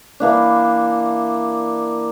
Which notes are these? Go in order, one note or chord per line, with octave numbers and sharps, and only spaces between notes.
E3 A#3 D4